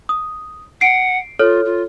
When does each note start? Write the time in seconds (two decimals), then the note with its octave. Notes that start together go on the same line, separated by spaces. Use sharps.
0.09 D#6
0.81 F#5 C7 D7
1.39 F4 A4 C#5 F6
1.65 F4